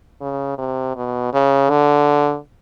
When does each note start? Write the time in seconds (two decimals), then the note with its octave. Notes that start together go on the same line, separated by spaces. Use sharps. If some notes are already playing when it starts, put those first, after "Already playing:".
0.21 C#3
0.58 C3
0.96 B2
1.33 C#3
1.70 D3